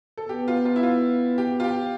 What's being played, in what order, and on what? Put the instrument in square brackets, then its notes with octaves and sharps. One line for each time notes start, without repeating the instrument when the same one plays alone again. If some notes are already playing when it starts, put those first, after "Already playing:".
[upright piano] A4
[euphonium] B3 [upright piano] G4
[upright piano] F4
F4
E4
F4
G4
F4
G4